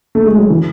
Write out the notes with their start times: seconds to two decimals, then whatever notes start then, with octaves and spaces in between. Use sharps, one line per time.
0.15 A3
0.27 G#3
0.38 F#3
0.50 E3